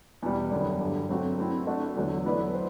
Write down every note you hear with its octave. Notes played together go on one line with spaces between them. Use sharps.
E2 B2 G3
F#2 D3 G3 B3
G2 D3 G3
F#3 A3 C4 F#4
A3 C4 E4
A3 D4 F#4
E2 D3 F#3 A3
F#3 B3 E4 B4 D5
C5